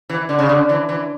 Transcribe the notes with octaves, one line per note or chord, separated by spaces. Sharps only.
E3
D3
C#3
D3
E3
E3